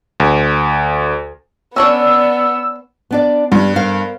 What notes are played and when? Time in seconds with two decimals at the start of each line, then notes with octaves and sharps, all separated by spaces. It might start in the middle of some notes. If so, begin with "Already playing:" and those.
0.20 D2
1.76 B3 C#4 D4 C#5 D5 E6
3.11 B3 D4 D5
3.52 G2 G3
3.76 A#4 C5 F5